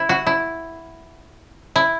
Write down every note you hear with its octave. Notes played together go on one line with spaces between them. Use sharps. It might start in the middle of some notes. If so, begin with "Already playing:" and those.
Already playing: E4
F#4
E4
E4